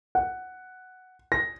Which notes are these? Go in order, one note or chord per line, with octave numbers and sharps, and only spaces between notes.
F#5
A#6